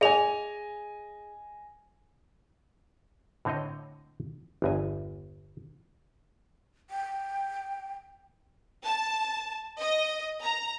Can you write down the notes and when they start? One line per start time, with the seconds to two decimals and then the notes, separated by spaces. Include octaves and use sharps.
0.01 G#4 D#5 G#5 F7
3.45 A2 D3 C4 C#5 D#5
4.62 G1 E2 G#5
6.90 G5
8.85 A5
9.80 D#5
10.43 A#5